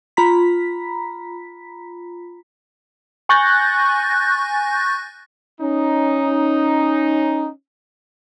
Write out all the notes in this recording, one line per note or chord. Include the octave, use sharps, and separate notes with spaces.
F4 A#5 B5 B6
G#5 C#6 F#6 G6 A6 A#6
C#4 D#4